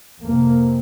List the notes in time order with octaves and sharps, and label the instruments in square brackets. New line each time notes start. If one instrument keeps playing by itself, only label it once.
[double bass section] F2 C3 A#3